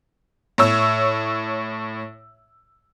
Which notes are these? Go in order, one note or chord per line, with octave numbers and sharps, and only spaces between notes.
A2 C#5 E6